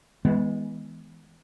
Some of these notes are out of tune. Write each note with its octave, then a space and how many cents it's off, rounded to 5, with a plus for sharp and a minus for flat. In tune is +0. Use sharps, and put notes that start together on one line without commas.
E3 -45 G#3 +0 B3 +0